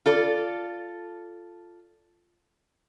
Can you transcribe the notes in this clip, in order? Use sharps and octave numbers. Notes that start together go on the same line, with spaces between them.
F4 A4 D5